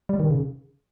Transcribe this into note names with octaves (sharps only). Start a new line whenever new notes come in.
G3
D#3
C#3